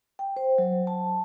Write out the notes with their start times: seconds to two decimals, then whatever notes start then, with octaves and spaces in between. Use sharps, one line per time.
0.19 G5
0.36 C5
0.58 F#3
0.87 A5